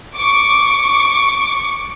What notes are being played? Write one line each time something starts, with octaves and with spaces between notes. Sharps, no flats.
C#6 D6